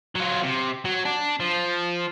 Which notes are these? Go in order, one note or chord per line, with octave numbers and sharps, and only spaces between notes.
F#3 F4
C3
F#3
D4
F3